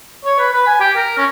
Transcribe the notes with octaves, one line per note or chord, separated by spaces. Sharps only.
C#5
B4
B4
G#5
G4
A#4
C#4